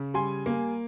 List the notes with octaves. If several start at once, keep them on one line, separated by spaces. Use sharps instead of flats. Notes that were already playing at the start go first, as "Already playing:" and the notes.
Already playing: C#3
G3 G#5 C6
A#3